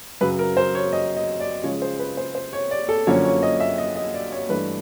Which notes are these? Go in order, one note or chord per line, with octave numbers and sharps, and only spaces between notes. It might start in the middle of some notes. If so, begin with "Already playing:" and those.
F#2 C#3 F#3 B4
A#4
C5
C#5
D#5
D#5
D5
C#3 F3 G#3 C#4 C#5
C5
B4
C5
C5
C#5
D5
A4
F#2 D3 F3 A#3 C#4 C#5
C#5
D#5
E5
D#5
D#5
D5
C#5
G2 E3 A3 D4 B4